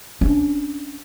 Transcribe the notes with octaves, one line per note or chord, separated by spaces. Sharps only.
C#4 D4